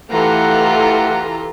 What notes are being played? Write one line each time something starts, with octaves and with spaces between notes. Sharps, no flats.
E3 A3 F4 G4 A4 F#5 A#5